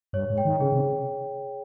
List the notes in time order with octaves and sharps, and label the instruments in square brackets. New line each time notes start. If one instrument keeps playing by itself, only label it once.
[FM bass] G2 [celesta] C#5
[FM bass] G#2
[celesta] G5
[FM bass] D#3
[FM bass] C#3 [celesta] G#4
[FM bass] C3